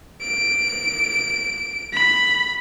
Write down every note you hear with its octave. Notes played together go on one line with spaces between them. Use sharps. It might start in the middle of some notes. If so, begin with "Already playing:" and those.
D7
B5